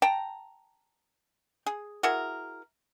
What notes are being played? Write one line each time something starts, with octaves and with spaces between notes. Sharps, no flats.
G5 A5 A#5
G#4
E4 F#4 G#4 A#4